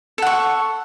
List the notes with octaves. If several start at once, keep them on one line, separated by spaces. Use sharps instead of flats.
A4 F#5 C#6